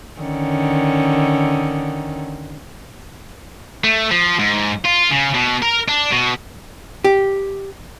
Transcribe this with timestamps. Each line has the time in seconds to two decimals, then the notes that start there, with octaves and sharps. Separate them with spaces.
0.20 D3 D#3 C#4
3.84 A3
4.11 F3
4.39 G#2
4.85 F4
5.11 C#3
5.34 B2
5.62 A#4
5.88 D4
6.12 B2
7.04 G4